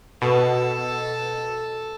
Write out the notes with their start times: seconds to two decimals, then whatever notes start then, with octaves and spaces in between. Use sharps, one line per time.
0.22 B2 A4